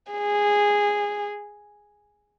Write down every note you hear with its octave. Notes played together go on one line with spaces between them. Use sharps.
G#4